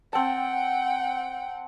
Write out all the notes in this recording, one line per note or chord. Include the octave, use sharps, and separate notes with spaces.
C4 F#5 G5 A5